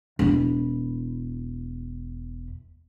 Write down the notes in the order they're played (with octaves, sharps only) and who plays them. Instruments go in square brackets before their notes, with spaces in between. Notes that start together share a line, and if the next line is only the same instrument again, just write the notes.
[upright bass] E1 E4